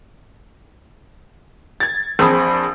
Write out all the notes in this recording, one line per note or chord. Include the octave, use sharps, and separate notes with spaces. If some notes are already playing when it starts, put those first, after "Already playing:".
G#6 A6
A#1 C4 G#4 A5 B5 D#6